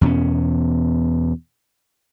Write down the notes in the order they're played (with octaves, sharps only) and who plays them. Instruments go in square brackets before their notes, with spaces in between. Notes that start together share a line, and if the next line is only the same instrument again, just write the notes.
[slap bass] E2 B2 B3 C#4